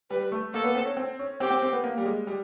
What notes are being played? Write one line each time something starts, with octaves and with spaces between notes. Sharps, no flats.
G3 B4
A3
A#3 A4
B3
C4
C#4
C4
C#4
C4 G4
C4
C4
B3
A#3
G3
G#3
G3